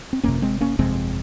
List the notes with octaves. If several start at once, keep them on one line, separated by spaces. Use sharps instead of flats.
C4
G1 F2 C3 A#3 C#4
G#3 C4
A#3 C#4
G1 F2 C3 G#3 C4